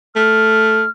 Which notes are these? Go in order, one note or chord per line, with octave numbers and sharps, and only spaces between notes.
A3 F6